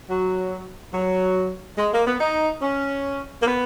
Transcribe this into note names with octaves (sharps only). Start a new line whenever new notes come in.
F#3
F#3
G#3
A#3
B3
D#4
C#4
A#3
B3